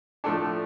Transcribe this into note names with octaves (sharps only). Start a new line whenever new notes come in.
A2 F3 A3 D4 A4